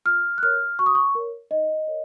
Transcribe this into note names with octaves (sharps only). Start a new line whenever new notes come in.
F4 F6
F#6
A#4 C#5 F6
F#4 C#6
D#6
C#6
A#4 C#5
D#4 D#5
A#4 C#5